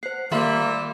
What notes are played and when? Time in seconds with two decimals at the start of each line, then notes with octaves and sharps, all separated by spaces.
0.03 C5 F#5 C7
0.31 D#3 G3 A#3 F4 E5 B5 C6